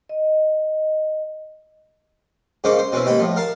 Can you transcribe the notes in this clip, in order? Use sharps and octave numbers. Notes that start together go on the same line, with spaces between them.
D#5
G#2 C#3 A#3 C5 C#6 D6
C5
B2 C4 C#4 E4
D#2 G#2 G5 B5
A2 F3
A#4 F5 A5